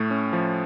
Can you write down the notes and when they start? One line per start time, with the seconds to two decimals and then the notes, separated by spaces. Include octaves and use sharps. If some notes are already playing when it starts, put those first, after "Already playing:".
Already playing: A2 A3
0.11 C#4
0.33 F3